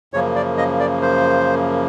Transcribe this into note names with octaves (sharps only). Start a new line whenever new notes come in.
F#2 C#3 F3 A#3 C#5
D5
D#5
D5
C5